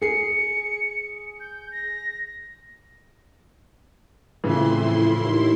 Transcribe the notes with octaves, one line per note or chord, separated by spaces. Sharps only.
G#4 C7 C#7
G6
A#6
F2 A2 C#3 E3 E4 C6
D#2